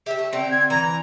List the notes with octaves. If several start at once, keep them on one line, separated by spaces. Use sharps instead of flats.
G4 E5 G5
A3
D3 C4 G5
G#6
E3 A#5